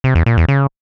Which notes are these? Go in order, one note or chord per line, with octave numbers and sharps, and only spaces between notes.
C3
E2
A#2
E2
C#3